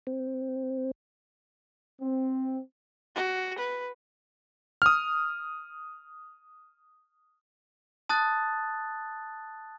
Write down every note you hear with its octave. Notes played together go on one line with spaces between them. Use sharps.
C4
C4
F#4
B4
D#6 F6
A5 D#6 F#6 A6